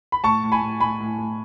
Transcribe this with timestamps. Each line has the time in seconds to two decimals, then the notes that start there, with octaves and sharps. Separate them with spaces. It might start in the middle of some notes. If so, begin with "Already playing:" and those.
0.12 B5
0.24 A2 A5 C#6
0.43 A2
0.52 G#5 B5
0.62 A2
0.80 A2 G#5 B5
1.01 A2
1.19 A2